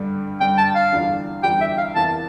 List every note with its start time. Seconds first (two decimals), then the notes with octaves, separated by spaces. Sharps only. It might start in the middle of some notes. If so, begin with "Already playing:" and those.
Already playing: G2 D3 G3
0.40 G2 D3 G3 G5
0.58 A5
0.75 F5
0.92 E2 D3 G3 D4 F4
1.43 E2 D3 G3 D4 F4 G5
1.61 E5
1.78 F5
1.95 E2 C3 E3 A#3 A5